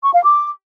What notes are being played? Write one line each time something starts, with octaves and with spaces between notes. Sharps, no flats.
C#6
F5
D6